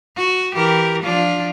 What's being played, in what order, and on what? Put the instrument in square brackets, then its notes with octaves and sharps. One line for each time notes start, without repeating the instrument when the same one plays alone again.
[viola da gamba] F#4
E3 G4 A#4
F3 D4 F4